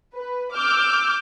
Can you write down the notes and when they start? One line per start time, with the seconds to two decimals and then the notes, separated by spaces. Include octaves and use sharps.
0.15 B4
0.54 D6 E6 F6 G6